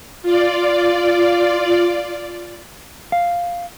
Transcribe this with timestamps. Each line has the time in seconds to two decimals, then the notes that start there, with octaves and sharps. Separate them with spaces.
0.23 F4 D5
3.12 F5